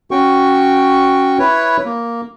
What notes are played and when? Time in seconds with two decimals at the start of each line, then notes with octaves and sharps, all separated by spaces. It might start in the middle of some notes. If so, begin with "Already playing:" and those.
0.11 C#4 F#4 G5 C#6
1.39 E4 B4 C#5
1.85 A#3